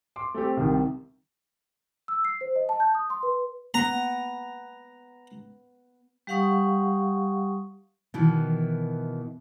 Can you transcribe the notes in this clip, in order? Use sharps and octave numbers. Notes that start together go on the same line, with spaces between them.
C6 D6
A3 C4 G4
C2 C3 D#3
E6
C7
C5
D#5
A5
G6
D#6
C6
B4
B3 A#5
G3 G4 F5 F#5 C#6 D#6
B2 D#3 E3